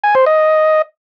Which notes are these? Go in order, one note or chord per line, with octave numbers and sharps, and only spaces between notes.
G#5
C5
D#5